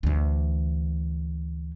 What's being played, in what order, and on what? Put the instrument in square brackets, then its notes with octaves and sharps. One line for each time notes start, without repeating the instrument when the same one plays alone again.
[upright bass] D2 E3